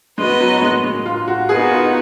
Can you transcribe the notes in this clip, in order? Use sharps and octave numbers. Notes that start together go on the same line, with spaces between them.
G#3 B3 F#4 B4 D#5
F#3
G#3
G#3
F4
F#4
B3 D#4 F#4 G#4 B4
F4